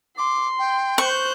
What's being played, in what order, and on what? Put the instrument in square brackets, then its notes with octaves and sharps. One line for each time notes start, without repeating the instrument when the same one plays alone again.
[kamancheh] C6 [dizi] D6
[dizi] G5
[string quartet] C5 F#6 G6 [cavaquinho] C#6